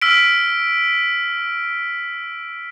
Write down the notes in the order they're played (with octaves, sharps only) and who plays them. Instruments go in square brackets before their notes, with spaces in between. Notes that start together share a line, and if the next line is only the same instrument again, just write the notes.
[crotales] E6 F6 B6 D7